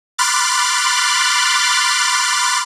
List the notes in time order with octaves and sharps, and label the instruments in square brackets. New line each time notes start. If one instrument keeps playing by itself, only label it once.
[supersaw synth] B5 C6 D6 F6 F#6 A6